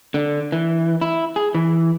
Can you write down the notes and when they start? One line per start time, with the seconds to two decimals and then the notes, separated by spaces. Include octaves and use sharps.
0.14 D3
0.52 E3
1.01 E4
1.36 G#4
1.55 E3